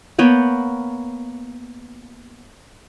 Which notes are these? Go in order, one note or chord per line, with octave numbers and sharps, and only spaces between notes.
A#3 B3 C#5 G5